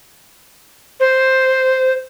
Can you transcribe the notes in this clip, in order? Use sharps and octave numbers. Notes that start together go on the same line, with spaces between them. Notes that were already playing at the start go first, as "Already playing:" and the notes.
C5